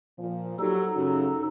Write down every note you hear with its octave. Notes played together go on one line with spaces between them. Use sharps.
A#2 F3
F#3 G3 D#4 G4 A4
F#2 C#3 F#4